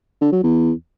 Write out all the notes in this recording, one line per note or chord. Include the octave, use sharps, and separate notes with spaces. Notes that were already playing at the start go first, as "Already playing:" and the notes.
D3
F#3
E2